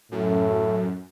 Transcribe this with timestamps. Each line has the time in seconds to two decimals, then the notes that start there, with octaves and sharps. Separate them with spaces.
0.11 F#2 A2